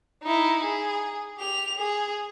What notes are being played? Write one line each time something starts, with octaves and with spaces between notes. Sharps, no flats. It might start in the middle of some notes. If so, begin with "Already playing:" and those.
D#4 E4
G#4
G4 F7
G#4